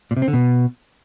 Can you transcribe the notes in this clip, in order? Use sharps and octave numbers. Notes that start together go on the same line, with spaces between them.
A#2
C3
C4
D3
B2